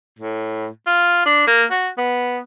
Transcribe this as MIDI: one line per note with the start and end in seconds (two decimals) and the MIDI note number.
0.19 0.67 45
0.87 1.21 65
1.26 1.47 62
1.47 1.64 58
1.71 1.89 66
1.98 2.39 59